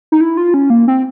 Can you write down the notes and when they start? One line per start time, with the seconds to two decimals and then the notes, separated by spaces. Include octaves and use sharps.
0.12 D#4
0.21 E4
0.37 F4
0.54 C#4
0.70 A#3
0.88 C4